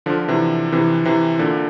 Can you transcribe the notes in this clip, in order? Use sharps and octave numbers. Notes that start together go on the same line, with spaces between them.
D3 F3
C3 E3
C3 E3
C3 E3
A#2 D3